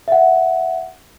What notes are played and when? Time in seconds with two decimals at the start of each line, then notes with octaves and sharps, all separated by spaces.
0.08 E5 F#5